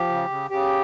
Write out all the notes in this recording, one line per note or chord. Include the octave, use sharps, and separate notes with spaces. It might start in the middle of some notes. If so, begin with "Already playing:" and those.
Already playing: F3 G4
C#3
C#3
C#3 G4